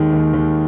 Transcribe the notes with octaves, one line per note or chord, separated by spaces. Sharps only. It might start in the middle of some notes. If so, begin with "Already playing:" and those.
Already playing: D#2 D#3 G#3
D#2
D#2